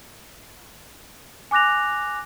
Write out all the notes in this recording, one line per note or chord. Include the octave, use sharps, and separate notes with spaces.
G#5 D6 F#6 A#6 F7